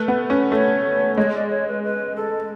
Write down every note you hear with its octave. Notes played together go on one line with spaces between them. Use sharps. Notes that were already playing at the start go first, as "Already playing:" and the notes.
Already playing: A3 B4
B3
C#4
A3 C#5
G#3 C#5
D5
C#5
B4
B4
A4